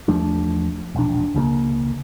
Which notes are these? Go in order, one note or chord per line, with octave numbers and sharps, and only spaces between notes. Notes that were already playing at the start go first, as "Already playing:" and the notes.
E2 F3 A3 D4
E1 A#1 D4
C#2 C#3 F#3 A#3